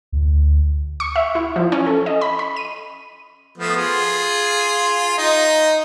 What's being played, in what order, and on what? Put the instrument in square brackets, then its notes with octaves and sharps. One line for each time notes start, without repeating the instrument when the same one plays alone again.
[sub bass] D2
[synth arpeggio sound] C#6
E5
E4
F3
C#4
A4
D#5
B5
B5
D#7
[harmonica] F3 A3 B3
F4 G#4
D#4